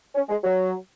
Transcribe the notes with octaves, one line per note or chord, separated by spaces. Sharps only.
C#4
G#3
F#3